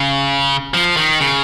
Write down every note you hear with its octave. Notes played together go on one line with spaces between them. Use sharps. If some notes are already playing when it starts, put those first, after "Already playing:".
Already playing: C#3
F3
D#3
C#3